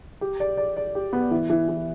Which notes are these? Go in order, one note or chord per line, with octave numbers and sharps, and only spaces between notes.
G4
D5
D5
D5
G4
B3
E3
E3
E3